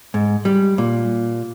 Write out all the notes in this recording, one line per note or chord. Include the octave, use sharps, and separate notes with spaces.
G#2
G3
A#2